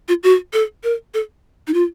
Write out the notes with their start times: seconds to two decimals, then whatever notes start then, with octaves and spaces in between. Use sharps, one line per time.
0.08 F4
0.23 F#4
0.53 A4
0.83 A#4
1.14 A4
1.67 D#4
1.74 F4